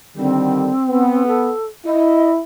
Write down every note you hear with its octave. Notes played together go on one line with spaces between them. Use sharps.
D3 D#3 G3 C4
B3
A4
E4 D#5